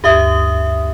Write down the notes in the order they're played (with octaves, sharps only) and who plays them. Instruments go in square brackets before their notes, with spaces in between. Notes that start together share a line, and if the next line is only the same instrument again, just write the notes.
[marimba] D2 G2 G#6 [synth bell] G4 E5 D#6